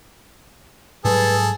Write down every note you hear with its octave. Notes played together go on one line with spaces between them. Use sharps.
G#2 F#3 G3 G#4 A4 B4